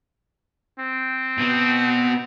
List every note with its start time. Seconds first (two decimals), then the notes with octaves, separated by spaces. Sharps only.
0.79 C4
1.38 B2 B3